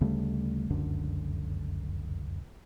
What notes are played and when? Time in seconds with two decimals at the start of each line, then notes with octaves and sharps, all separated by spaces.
0.01 D2 C#3 G3 A3
0.70 F1 C#2 F#2 D3